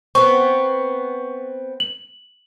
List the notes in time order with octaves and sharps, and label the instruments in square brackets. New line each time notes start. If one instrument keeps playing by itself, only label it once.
[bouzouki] B3 C4 [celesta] C#6
[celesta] F#7